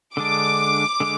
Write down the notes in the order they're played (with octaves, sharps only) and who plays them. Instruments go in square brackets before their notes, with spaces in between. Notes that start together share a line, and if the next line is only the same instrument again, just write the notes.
[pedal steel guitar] D3 G#3 D4 [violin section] D6
[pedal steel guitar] D3 G#3